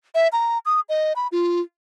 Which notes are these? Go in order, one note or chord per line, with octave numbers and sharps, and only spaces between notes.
E5
A#5
D#6
D#5
B5
F4